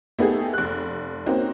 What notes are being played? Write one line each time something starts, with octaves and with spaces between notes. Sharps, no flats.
A3 B3 D#4 G4 G#4
F1 F#6
A#3 C4 C#4 D#4 F#4